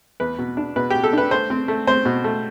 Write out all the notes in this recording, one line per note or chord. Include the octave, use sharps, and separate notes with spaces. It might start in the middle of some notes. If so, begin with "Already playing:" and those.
E2 B4
B2
D4
B2 B4
B2 G4
A4
D4 B4
A3 C5
C4
A3
C4 C5
B2
A3